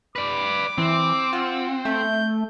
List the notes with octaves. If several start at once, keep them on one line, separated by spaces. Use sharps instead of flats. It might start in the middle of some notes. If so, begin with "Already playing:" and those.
B4 D5 D6
E3 C4
F4 F#5
A3 G6